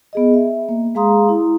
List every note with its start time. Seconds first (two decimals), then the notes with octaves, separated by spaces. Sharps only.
0.13 B3 G#4 D#5
0.34 E5
0.69 A#3
0.95 G#3 G#4 F5 A#5 C6 D#6
1.29 E4